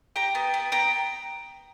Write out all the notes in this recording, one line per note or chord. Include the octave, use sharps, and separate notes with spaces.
G4 G5 A#5
B3
B3
B3 G5 A#5